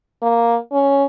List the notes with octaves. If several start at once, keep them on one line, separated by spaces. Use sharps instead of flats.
A#3
C#4